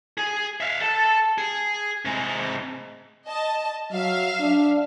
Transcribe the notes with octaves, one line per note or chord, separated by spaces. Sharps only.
G#4
E5 F5
A4 A5
G#4
C3 G#3
D#5 A5
F#3 E5 F5
D4